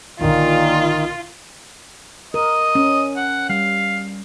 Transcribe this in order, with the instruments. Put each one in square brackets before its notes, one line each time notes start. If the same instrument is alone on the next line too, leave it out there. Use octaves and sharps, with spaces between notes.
[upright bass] A#1 D3 [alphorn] A#2 [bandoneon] D#3 [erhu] F4
[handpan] A#4 [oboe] D#5
[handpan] C#4
[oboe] F#5
[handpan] G3 [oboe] F5